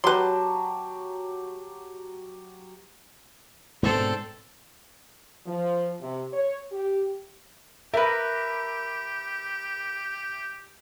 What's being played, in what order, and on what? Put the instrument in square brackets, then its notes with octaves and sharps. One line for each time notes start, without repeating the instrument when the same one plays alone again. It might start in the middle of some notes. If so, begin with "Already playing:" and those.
[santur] F#3 G4 A5 [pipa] B4 C6
[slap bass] G#2 B2 D3 [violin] C4 A4
[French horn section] F3
C3
C#5
G4
[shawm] G4 [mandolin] A#4 B4 [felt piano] E5